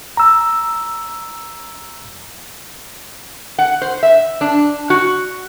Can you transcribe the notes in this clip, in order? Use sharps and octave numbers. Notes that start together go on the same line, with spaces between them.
A#5 E6
F#5
C5
E5
D4
F#4